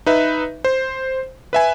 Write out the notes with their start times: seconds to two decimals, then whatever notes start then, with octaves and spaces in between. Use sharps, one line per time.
0.06 D#4 B4 E5
0.64 C5
1.53 B4 E5 G#5